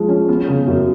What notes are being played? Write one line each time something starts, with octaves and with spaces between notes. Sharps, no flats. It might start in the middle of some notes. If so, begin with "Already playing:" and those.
Already playing: F3 G#3
C#4
B3
C#3
F#2